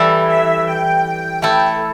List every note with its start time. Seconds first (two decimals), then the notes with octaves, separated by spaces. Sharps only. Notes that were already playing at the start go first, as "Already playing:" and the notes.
Already playing: E3 G3 E4 A4
0.28 E5
0.67 G5
1.42 A3 E4 A4